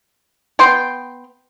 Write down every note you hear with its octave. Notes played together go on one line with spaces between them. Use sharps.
B3 G5 C6